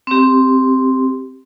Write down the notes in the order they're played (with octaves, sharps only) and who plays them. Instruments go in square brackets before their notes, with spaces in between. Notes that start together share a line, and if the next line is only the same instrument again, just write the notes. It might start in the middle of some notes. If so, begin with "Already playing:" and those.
[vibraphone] C4 G4